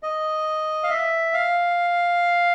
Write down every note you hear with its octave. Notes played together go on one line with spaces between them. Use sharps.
D#5
F5
E5
F5